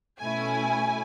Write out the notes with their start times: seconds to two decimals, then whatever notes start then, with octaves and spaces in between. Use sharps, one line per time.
0.20 B2 A3 C#4 E4 G#5